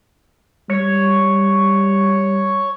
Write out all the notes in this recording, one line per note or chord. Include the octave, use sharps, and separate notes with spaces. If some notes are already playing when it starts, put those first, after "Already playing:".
G3 C#5